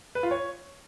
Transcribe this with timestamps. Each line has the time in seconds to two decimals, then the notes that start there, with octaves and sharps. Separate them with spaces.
0.15 B4
0.23 F4
0.31 C#5